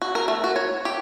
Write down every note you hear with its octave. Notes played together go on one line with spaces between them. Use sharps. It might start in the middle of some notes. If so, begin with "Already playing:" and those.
F#4
A#4
A3
F#4
C#5
G4